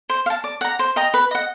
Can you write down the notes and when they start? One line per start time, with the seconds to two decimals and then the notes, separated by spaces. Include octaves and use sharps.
0.10 C5
0.26 F5
0.30 A5
0.44 D5
0.61 F#5 A#5
0.79 C5
0.96 D#5 G5 A#5
1.14 B4
1.31 D#5 F#5